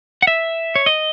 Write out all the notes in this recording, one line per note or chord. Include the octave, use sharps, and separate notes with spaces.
F#5
E5
C#5
D#5